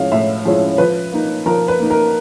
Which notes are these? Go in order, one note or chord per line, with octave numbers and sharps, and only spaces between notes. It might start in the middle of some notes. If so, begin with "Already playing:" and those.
Already playing: A2 F3 G#3 C#4 E4 F5
A2 E5
F3 G#3 C#4 E4
F3 B4
A#3 D#4
F3 A#4
B4
A#3 D#4
A#4